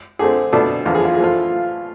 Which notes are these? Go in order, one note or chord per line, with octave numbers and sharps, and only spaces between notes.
D3 A3 C4 G#4
B2 A3 D4
E2 D3 F3 F4
G#4
F4
G#4
F3 A3 F4